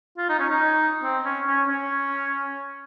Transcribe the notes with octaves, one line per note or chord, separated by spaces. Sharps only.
F4
D#4
C#4
D#4
C4
C#4
C#4
C#4